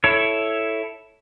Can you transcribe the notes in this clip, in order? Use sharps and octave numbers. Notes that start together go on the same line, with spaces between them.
E4 A4 C#5